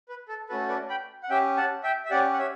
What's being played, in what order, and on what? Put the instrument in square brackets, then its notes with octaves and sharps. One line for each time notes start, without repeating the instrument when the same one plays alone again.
[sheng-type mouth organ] B4
A4
A3 C#4 F#4 A4 B4
B4 D5
G5 B5
F#5
C#4 G4 E5 G5
F#5 A5
E5 G5
E5
C#4 G4 D5 F#5
F#5
C#5 E5